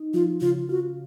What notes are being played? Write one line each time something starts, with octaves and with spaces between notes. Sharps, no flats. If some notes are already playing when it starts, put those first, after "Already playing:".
Already playing: D#4
F3 F4
C#3 F4
F4 F#4